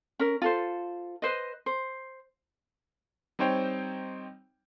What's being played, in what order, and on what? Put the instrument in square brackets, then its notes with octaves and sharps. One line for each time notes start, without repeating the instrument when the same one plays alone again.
[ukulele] C#4 A#4
F4 A4 C5
B4 C5 D#5
C5
[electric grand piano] G3 C4 D#4 C5 C#5 G5